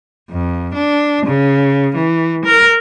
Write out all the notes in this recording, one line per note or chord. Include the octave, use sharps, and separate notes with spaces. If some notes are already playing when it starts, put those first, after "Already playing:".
F2
D4
C#3
E3
A#4